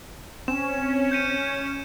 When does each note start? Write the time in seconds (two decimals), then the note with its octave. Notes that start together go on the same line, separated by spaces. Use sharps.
0.48 C4 C#4 E7
1.11 G6 C#7 D#7